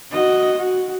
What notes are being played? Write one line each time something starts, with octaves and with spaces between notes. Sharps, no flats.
F#4 D#5
F#4